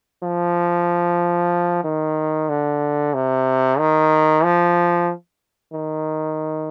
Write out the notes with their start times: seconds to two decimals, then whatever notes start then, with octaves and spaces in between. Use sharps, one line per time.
0.23 F3
1.84 D#3
2.49 D3
3.14 C3
3.79 D#3
4.44 F3
5.73 D#3